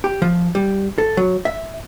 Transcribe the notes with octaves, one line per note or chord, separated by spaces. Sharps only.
G4
F3
G3
A4
F#3
E5